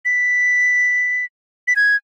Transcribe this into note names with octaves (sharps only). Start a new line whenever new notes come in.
B6
B6
G#6